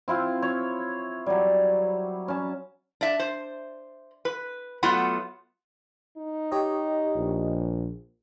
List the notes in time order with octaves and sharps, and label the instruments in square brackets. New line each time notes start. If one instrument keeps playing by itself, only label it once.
[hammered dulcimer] C4 E4 F4
C#5
F#3 G3
C#4 A5
[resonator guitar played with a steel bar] D4 E5
C5
B4
F#3 A3 B3 F4 F#5
[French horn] D#4
[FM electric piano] G4 C#5 D#5
[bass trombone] A#1